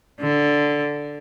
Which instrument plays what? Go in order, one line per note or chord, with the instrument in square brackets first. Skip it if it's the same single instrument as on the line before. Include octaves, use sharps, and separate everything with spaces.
[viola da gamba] D3